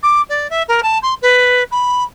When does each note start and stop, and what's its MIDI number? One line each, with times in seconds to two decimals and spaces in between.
0.02 0.21 86
0.29 0.49 74
0.50 0.62 76
0.68 0.80 70
0.82 0.98 81
1.02 1.14 84
1.21 1.63 71
1.71 2.03 83